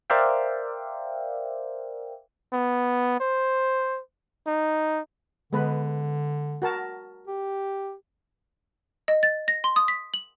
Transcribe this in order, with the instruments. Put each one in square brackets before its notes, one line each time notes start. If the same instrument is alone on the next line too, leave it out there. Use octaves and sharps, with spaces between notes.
[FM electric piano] A#4 C5 D5 E5 F5 G5
[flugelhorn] B3
C5
D#4
[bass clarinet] D3 [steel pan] G#3 B3 B4
[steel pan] F#4 A#4 A5
[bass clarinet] G4
[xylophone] D#5
A6
A#6
C6
D#6
B6
F#7